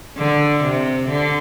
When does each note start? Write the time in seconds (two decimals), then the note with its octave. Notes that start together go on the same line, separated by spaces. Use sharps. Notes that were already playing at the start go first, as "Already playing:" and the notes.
0.17 D3
0.63 C3
1.09 D3